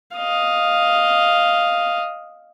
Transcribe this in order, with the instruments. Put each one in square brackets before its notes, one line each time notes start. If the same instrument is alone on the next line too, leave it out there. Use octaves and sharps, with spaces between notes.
[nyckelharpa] D#5 F5